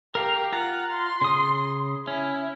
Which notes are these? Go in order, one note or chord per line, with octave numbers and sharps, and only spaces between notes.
G4 A#4 F5 A#5
F4 F#5 A#5
C6
C#3 D#6
C#4 E4